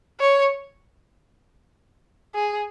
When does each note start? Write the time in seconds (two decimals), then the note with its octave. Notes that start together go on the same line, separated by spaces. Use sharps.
0.20 C#5
2.35 G#4